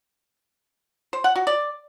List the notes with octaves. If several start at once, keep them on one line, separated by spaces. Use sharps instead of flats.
C5
F#5
F#4
D5